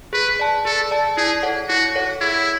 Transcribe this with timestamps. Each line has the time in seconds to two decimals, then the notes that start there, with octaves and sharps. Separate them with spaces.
0.13 G#4 B4
0.40 D5 A5
0.65 G#4 A4
0.91 D5 A5
1.17 E4 G#4
1.43 A4 C#5 F#5
1.69 E4 F#4
1.96 A4 C#5 F#5
2.21 E4 G#4